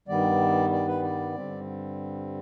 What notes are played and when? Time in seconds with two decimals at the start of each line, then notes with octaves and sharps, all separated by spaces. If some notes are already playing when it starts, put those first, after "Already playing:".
0.08 G2 D#3 G3 B3 D5
0.72 D5
0.87 B4
1.03 D5
1.35 G2 D3 G3 C4